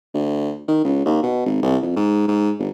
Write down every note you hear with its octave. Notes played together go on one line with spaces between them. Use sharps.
D2
D#3
C#2
D#2
B2
G#1
C2
F2
G#2
G#2
G1